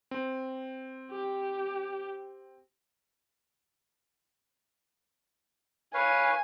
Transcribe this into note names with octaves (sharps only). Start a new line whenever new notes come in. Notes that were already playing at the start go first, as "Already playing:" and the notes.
C4
G4
B4 C#5 F5 G#5